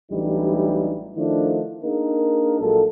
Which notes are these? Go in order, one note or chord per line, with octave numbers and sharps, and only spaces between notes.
A1 E3 F#3 G3 D4 D#4
D#3 F3 A3 D4 E4 F4
A#3 D4 D#4 G#4 A#4
A#1 A#2 F#3 G#3 A4